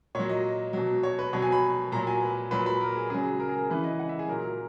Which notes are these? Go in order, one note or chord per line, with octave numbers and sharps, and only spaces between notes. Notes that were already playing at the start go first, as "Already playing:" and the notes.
A#2 F#3 C#5
D#5
B2 F#3
C#5
B4
B2 F#3 C#5
G#5
B5
A#2 F#3 A#5
G#5
B4
A#2 F#3 B4
B4
A#4
G#4
C#3 F#3 G#4
A#4
G#4
A#4
C#3 E3 B4
D#5
F#5
E5
G#4
A#2 F#3 A#4